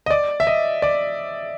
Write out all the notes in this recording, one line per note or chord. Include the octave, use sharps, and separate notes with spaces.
D#5
D5
E5
D#5
D5